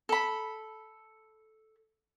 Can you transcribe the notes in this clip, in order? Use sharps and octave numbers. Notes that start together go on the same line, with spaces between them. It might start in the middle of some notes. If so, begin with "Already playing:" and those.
A4 B5